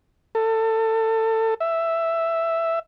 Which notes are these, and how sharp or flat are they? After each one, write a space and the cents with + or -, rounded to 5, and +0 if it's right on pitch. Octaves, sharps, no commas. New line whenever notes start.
A4 +25
E5 +5